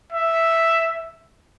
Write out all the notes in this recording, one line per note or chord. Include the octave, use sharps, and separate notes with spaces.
E5